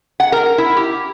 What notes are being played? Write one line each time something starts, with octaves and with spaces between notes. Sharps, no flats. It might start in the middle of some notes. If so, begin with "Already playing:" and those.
F#5
A#4
E4
G4